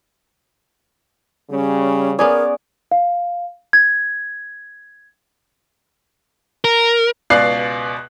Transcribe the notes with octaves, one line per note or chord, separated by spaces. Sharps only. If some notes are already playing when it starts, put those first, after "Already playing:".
C#3 G3 C#4
B3 C#4 G#4 A#4 D5
F5
G#6
A#4
C#2 B2 D5 F5 F#6 C7